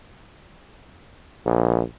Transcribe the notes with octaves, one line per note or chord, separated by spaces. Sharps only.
A#1